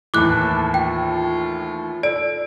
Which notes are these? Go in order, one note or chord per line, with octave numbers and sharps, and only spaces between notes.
D#2 A2 E3 D6 F#6
A5
F4 G5
A4 D5 D7